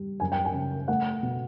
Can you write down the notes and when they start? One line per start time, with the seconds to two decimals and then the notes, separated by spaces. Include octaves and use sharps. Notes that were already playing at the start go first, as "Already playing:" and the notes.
Already playing: G3
0.20 F#2 G#5
0.32 G5
0.45 G#5
0.54 C#3
0.88 A3 F#5
1.23 B2